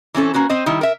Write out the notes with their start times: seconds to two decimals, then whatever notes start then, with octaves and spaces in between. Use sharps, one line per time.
0.14 E3 C4 C#4 A4
0.34 A#3 C#4 F#4 B4
0.49 C4 C5 D#5
0.66 D#3 G3 E4
0.81 A#4 E5